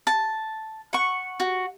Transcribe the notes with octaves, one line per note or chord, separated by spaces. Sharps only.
A5
F#5 C#6
F#4